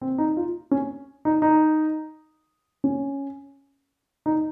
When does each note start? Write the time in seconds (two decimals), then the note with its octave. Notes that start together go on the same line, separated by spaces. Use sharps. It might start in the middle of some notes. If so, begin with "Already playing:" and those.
0.01 C4
0.18 D#4
0.37 F4
0.71 C#4
1.25 D#4
1.42 D#4
2.84 C#4
4.26 D#4